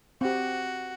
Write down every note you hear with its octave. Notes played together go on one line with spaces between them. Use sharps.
C4 F#4 G4